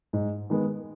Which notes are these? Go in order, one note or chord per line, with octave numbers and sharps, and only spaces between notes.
G#2
D#3 G#3 B3